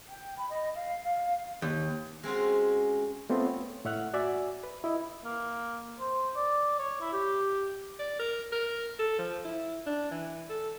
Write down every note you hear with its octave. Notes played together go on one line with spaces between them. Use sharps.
G5
B5
D#5
F5
F5
D#2
G#3 C4 C#4 F#4
A3 B3 C4 F4
C#5
A2 C#5 E5 F#5 F6 F#6
F#4 D5 E5 G#5
B4
E4 D#5
A#3
C5
D5
C#5
E4
G4
D5
A#4
A#4
A4
F3
E4
D4
E3
A4